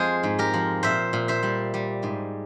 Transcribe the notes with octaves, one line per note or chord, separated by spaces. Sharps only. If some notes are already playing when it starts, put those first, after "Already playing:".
Already playing: F2 G#3 G#4 C5 F5 G#5
G#2
G4 A#4
F3
A#2 C5 E5
A#2
C5 E5
G3
G3
G#2